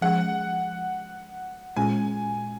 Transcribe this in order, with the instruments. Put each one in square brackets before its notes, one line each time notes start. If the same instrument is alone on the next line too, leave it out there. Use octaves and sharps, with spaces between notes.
[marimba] F3 G#3 C#4 G#4 [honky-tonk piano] F#5
[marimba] A#2 G#3 C#4 F4 G#4 [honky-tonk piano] G#5